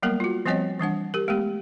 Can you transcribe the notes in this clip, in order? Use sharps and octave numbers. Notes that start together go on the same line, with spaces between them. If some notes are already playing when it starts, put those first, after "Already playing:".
F#3 G3 A#3 B3 A#4
F4 F#4
F3 G3 B3 C4 C#5 D#5
E3 G3 D4 F#5
G4 A#4
G#3 A3 B3 G4